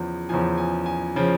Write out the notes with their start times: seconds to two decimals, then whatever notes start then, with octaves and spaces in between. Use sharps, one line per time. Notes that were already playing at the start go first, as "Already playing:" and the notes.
Already playing: E2 C#3 F3
0.29 E2 C#3 F3 G#5
0.58 G#5
0.86 G#5
1.16 C#3 F3